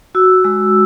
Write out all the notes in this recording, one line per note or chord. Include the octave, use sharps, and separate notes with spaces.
F#4 E6
G#3 E6